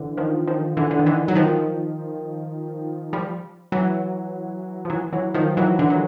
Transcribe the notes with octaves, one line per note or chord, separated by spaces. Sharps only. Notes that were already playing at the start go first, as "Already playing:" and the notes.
Already playing: D3 E3
D#3 F3
D#3 F3
D3 E3
D3
D#3
D3 E3
F#3
D#3 F3
F3 G3
E3 F#3
F3
E3 F#3
E3 F#3
D#3 F3
E3 F#3
D3 E3
F#3